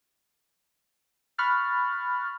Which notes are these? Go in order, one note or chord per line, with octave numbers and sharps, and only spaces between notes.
B5 C#6 F6 F#6 A6